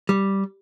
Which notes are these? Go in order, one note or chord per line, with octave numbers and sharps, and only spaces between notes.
G3